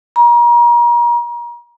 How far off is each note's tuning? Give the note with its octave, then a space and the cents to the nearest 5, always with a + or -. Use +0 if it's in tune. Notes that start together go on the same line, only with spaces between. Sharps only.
A#5 +35